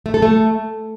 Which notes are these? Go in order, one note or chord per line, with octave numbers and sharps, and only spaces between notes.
A3
A4
A3